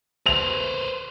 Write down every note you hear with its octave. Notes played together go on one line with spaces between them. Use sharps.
B4 C5 F7